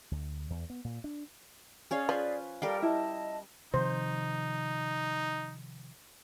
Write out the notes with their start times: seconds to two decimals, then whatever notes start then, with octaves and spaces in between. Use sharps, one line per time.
0.11 D2
0.50 E2
0.70 B3
0.85 A#2
1.04 D4
1.91 C#4 G#4 C#5 D5 F5
2.09 F3 B4
2.62 G3 G4 A4 A#4 D5 F5
2.82 E4 D#5 A5
3.74 C3 D#3 F3 D#4 C5